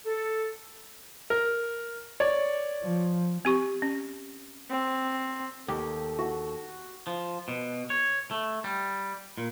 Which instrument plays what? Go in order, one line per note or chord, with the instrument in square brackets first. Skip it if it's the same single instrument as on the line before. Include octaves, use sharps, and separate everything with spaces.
[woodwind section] A4
[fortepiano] A#4
C#5 D5
[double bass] F3
[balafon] C4 G4 C#6
C#4
[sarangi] C4
[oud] D#2 [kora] G4 [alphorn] A4
[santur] F#4
[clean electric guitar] F3
B2
C#5
A3
G3
A#2